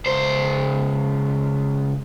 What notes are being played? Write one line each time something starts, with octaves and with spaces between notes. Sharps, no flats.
C#2 C5